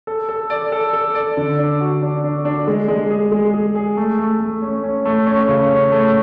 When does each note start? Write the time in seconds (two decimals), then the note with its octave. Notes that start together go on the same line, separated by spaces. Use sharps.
0.07 A4
0.29 A4
0.50 D5
0.72 A4
0.93 A4
1.15 D5
1.37 D3
1.58 D4
1.80 F#4
2.02 D4
2.24 D4
2.45 D4
2.67 G#3
2.88 G#3
3.10 G#4
3.32 G#3
3.53 G#4
3.75 G#4
3.97 A3
4.18 A3
4.40 A3
4.62 C#4
4.83 C#4
5.05 A3
5.27 C#4
5.48 C#3
5.70 C#4
5.92 A3